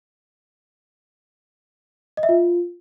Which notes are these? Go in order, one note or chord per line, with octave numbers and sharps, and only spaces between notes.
D#5
E5
F4